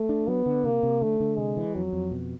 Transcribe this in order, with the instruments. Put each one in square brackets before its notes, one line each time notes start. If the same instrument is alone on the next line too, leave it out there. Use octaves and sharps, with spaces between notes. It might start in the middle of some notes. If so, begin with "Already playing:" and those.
Already playing: [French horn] A3
[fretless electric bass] D4
[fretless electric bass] F#3 [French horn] B3
[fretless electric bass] D3
[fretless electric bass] C3 [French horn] A#3
[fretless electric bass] C3
[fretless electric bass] D3 [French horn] A3
[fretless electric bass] D3
[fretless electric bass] C3 [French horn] G#3
[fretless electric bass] E3
[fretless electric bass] F2 [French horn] F#3
[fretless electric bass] F2
B2